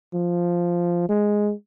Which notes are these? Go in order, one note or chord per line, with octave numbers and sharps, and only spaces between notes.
F3
G#3